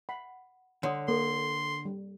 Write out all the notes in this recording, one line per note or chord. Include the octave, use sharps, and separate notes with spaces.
F#5 B5
D3 C#5 C6 D#6
A#3 A4 C6
G3